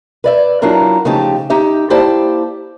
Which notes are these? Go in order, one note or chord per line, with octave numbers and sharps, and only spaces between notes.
B4 D5 E5
F#3 D4 E4 F4 A#4
C#3 F3 A3 D#4 G4 A5
D#4 G4 E5
A#3 E4 G4 C5 D5 A5